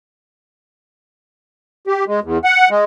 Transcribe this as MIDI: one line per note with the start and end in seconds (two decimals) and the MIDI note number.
1.87 2.04 67
2.07 2.20 56
2.23 2.38 40
2.44 2.69 78
2.70 2.84 56